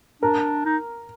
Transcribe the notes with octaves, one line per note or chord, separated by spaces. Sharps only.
D4 A#4
D#4